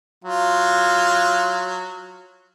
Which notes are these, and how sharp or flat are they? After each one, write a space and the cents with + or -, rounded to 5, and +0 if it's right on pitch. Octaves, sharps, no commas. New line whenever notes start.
F#3 -10 F4 +0